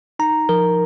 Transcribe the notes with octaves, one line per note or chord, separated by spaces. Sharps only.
D#4 A#5
F3 A#4